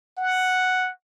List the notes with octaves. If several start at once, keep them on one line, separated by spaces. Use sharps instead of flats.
F#5